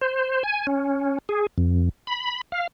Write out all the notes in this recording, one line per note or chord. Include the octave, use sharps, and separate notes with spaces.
C5
G#5
C#4
G#4
F2
B5
F5